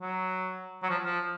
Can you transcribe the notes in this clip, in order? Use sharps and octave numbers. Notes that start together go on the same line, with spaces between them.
F#3
F#3
F3
F3